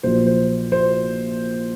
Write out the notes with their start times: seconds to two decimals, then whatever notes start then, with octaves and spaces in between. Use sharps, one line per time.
0.03 A#1 A#2 F#3 C5
0.27 C5
0.72 C5